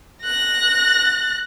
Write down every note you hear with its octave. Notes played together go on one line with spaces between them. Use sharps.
F#6 A#6